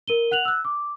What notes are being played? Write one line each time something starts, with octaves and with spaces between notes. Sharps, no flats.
A#4 D#7 G7
F#5 F#6 F7 F#7
E6 F#6
D6